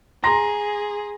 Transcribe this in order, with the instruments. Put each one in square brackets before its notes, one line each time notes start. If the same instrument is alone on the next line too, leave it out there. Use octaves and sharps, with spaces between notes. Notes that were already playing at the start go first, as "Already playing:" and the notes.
[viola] G#4 [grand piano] A#5 C6 A#6